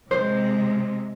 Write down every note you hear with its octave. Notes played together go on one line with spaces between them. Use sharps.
C3 G#3 C5